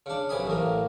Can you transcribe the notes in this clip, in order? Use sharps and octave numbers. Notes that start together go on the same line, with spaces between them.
C#3 D4
B1 C3 G#5 B5 D#6
A1 A2 A#3